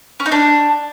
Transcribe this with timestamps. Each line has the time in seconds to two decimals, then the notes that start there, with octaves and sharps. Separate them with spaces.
0.20 C#4
0.26 D#4
0.32 D4